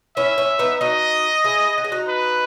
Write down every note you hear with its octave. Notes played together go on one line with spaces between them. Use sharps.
C#4 E4 E5
C#4 E4
B3 D#4
D#4 F#4 D#5
E4 G#4
F#4
G#4
D#4 F#4
B4